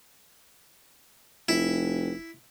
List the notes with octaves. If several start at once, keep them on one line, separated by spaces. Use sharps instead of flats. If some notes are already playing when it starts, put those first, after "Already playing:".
F1 E4